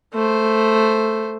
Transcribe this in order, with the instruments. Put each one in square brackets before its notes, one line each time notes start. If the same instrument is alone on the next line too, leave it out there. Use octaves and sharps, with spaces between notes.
[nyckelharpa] A3 C5